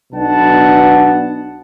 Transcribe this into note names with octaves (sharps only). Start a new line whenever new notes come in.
B1 B2 B3 D4 F#5 A5